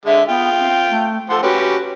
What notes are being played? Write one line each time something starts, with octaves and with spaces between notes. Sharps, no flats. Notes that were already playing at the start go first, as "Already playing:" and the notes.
D3 G#3 E5
B3 F4 G5
C4
A3
F3 A4 F#5 C6
C#4 F#4 G4 B4